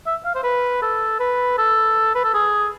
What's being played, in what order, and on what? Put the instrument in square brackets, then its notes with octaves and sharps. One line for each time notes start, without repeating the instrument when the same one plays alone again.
[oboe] E5
F5
C5
B4
A4
B4
A4
B4
A4
G#4